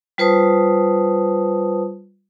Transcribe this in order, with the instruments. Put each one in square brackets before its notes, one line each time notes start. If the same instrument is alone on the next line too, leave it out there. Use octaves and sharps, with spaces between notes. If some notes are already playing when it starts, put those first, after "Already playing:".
[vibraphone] G3 F4 B4 C5 A5 D#6